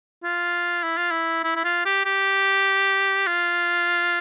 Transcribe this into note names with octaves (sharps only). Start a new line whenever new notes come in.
F4
E4
F4
E4
E4
E4
F4
G4
G4
F4